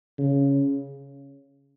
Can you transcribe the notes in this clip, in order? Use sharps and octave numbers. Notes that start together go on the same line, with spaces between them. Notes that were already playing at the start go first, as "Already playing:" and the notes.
C#3